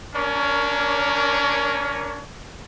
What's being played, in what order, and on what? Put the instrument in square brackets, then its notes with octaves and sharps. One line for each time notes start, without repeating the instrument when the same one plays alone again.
[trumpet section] A#3 C#4 D4 A#4 C#5